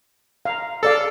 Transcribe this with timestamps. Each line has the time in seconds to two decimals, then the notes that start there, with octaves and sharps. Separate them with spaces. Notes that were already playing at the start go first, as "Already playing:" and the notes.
0.45 F5 A#5
0.83 G#4 A4 D5 F5